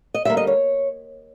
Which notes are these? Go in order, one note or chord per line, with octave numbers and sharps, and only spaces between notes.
D#5
D3 G3 A#3 E5
D#5
C#5